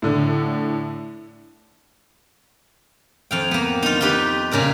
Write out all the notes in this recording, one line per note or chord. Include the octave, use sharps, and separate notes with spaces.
A2 D3
F2 F5 G5
A#3 B3
D#4 F4
D#4 F4 G4 B4
A#2 C#3 A#4 D#5